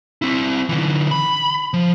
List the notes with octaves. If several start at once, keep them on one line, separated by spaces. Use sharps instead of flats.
C4 E4
D3 E3
B5
F3